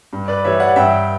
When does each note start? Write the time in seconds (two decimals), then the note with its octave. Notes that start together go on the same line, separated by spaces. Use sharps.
0.13 G2
0.28 B4 D5
0.44 E3 G3 C#5 E5
0.60 D5 F#5
0.76 G2 E5 G5